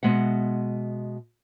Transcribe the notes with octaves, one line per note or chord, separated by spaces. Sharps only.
B2 G#3 E5 F#5